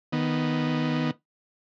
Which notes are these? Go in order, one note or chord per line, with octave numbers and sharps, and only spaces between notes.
D#3 B3